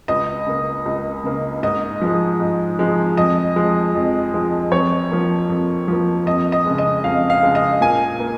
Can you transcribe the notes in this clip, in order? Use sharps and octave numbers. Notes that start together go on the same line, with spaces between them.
C#2 D#5
C#3 A#3
C#2
C#3 A#3
G#2 D#5
F3 G#3
G#2
F3 G#3
F2 D#5
F3 G#3
F2
F3 G#3
F2 C#5
F3 A#3
F2
F3 A#3
F2 D#5
D#5
C#3 G#3
D#5
F2 F5
F5
C#3 G#3
D#5
A#2 G#5
A#3